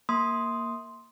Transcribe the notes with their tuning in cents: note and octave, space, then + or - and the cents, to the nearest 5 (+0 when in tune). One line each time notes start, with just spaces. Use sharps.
A#3 +0 C6 +0 D#6 +5